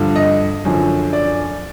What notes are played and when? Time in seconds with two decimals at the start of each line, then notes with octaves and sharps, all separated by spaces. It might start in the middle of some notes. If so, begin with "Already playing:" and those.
Already playing: G2 D3 F3
0.16 D#5
0.65 F#2 D3 F3
1.13 D5